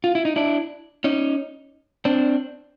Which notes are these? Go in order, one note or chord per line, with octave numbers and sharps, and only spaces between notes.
F4
E4
D#4
D4 E4
C#4 D#4
C4 D4